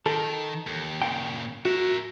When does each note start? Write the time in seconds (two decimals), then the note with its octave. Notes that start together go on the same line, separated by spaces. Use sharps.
0.06 D#3 A4
0.66 D#2
1.02 A#2 C#3 G5
1.65 F#4 A#4 E5